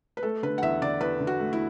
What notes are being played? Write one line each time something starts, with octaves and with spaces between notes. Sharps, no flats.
B4
A3 A4
D3 B4
F#5
E2 E5
D3 D5
E2 B4
D3
F#4
A3
E4